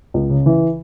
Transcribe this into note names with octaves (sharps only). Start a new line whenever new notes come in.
C#2
C#3
E3